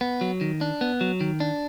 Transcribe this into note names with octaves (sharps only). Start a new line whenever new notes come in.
B3
F#3
D#3
D4
B3
F#3
D#3
D4